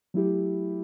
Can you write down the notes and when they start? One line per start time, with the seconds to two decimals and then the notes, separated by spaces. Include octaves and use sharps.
0.14 F#3 A3 E4 G4